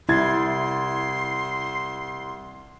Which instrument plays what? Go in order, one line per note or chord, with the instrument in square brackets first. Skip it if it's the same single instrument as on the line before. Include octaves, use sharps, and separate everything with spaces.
[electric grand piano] C2 G#6 A6 [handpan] E4 [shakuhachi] C6